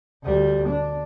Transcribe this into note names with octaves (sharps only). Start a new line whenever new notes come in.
D2 G3
D4